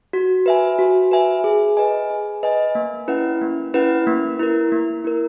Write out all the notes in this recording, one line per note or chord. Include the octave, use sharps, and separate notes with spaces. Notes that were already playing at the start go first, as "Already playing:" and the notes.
F#4
B4 E5 G#5
F#4
B4 E5 G#5
G#4
B4 D#5 G#5
G#4
B4 D#5 G#5
A#3
C#4 E4 B4 F#5
A#3
C#4 E4 B4 F#5
A#3
E4 A#4
A#3
E4 A#4